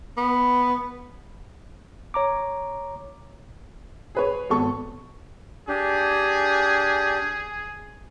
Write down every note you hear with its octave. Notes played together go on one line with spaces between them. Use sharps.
B3
C#5 A#5 D6
G#4 B4 C#5
G#1 B3 A4 C#6
D4 G4 G#4